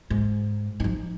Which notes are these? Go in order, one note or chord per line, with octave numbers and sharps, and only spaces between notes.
G#2
F3 D#4